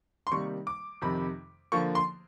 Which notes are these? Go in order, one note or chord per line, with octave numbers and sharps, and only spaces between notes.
C6
C3 D#3 G3 A#3 C#6
D6
F2 C3 D#3 B5
D3 F3 A#3 C#6
C6